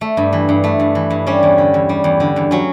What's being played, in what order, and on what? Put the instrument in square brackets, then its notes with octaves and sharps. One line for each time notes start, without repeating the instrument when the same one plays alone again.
[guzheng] A3
G2
E3
G2
A3
G2
E3
G2
G3 C#4
E2
D3
E2
G3
E2
D3
E2
F#3 C#4